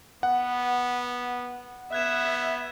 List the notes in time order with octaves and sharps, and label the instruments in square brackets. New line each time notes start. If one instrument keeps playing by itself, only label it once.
[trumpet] B3 [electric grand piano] F#5
[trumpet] B3 [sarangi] E5 [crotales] F#6 G#6 E7